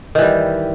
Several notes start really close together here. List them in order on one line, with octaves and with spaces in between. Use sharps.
D#3 E3 G3